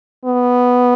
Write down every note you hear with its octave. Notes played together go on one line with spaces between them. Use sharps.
B3